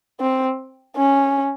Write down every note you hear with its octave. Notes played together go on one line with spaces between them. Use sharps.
C4
C#4